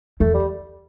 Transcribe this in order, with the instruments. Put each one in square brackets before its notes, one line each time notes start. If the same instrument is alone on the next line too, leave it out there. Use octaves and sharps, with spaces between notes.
[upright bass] E2 [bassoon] A3
[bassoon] G3